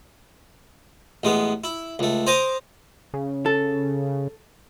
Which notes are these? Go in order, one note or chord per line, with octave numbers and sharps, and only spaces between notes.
A1 G#3 B3
E4
C#2 A3
C5 G#5 A#5 D6 D#6
C#3
A4